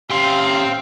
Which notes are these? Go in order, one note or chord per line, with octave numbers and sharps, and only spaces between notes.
C#4 G4 F5 G5 C6